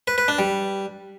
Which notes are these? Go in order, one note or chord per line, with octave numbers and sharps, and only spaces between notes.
B4
B4
D4
G3